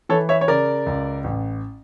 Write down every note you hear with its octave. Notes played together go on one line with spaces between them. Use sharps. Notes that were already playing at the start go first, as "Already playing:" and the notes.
E3 A4 C#5
C#5 E5
C#5
C#3 A#4 D5
C#2
A1